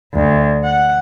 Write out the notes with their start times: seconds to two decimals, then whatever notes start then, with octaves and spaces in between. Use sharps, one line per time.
0.14 D2
0.64 F#5